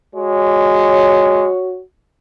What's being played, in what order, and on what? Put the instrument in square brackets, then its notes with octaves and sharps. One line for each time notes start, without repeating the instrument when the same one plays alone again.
[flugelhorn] G#3 [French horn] F#4 [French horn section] C#5